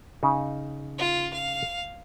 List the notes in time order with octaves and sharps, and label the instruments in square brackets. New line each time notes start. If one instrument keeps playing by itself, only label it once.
[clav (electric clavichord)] C#3 D#4
[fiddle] F4
F5